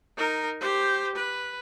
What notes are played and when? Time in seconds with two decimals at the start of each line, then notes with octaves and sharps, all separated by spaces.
0.17 D#4 A#4
0.60 G4 C5
1.15 B4